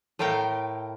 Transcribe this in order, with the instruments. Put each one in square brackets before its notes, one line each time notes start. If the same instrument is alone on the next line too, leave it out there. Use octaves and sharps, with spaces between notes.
[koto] A2 A3 A#4 F5 G5